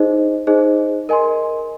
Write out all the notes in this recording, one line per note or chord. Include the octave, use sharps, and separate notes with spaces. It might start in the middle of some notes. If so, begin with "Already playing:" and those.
Already playing: D#4 G#4 C5 D#5
D#4 G#4 C5 D#5
A#4 D#5 G#5 C6